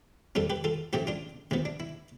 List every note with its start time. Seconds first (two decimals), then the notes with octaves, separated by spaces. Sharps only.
0.35 F2 C3 G3 F4 A4
0.50 G4 B4
0.64 F4 A4
0.93 A1 A2 F3 A3 E4 G4
1.07 D4 F4
1.51 D2 C3 F3 B3
1.65 D4
1.80 E4